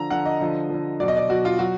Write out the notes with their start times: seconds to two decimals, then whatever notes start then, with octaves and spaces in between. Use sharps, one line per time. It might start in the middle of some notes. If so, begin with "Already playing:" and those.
Already playing: D3 F3 A#5
0.11 D3 F3 F#5
0.25 D#5
0.40 D3 F3
0.70 D3 F3
1.00 B2 F#3 D5
1.08 D#5
1.17 D5
1.29 B2 F#3 F#4
1.45 F4
1.59 F#3 F#4